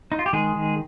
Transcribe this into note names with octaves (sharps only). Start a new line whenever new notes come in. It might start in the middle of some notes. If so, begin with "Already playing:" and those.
D#4
F4
G4
D#3 G#3 G#4
D#3